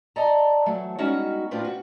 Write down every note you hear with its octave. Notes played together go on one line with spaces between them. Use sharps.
A4 D5 D#5 A5 A#5
E3 F#3 A3
G3 G#3 B3 C#4 D#4 F#4
A2 C4 D4 F4 B4
F#4